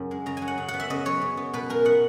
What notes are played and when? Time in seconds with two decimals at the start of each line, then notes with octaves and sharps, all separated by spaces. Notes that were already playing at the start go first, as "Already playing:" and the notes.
Already playing: F#2 C#3
0.11 G#3
0.26 C#3 A#5
0.37 F#3 G#5
0.48 F#5
0.58 C#3
0.68 F#5
0.74 B3
0.80 E5
0.90 C#3 D#5
1.05 F#3 C#5
1.21 C#3
1.37 B3
1.53 B2 B4
1.70 G#3 A#4
1.85 B2 F#5